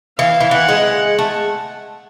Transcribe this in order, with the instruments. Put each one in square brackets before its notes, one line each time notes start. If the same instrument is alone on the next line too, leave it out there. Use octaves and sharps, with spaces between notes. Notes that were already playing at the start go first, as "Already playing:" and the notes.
[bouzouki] E3 [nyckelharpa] F5
[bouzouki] E3
[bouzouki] E3 [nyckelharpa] F#5
[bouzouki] G#3
A3